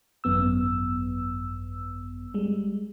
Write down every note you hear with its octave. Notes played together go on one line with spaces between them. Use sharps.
G#1 F#2 B3 E6
G3 G#3